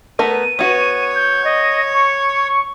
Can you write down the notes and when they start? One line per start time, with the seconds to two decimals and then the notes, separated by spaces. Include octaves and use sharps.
0.19 A3 B3 A#4 D#7
0.59 B3 F#4 C#5
1.15 G6
1.45 D#5
1.93 C#6